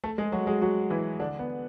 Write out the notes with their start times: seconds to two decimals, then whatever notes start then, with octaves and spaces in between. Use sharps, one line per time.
0.04 A3 A4
0.18 G#3 G#4
0.32 F#3 F#4
0.47 G#3 G#4
0.61 F#3 F#4
0.90 E3 E4
1.19 D3 D4
1.39 B3